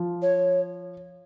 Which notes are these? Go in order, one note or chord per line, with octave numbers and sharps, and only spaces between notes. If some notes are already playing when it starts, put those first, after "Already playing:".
Already playing: F3
C#5